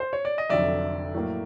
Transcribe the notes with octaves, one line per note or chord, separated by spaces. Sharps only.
C5
C#5
D5
D#5
F1 F2 D3 F#3 D5 E5
A2 F#3 A#3